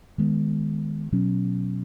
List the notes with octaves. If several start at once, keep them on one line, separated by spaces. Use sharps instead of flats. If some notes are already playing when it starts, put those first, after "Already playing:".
D#3 G#3 B3
B2 F#3 C#4